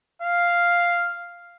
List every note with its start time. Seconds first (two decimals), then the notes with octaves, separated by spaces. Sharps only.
0.22 F5